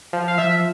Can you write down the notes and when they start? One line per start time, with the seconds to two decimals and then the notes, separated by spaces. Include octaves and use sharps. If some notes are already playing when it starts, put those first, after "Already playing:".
0.13 F3
0.28 F5
0.38 F3 E5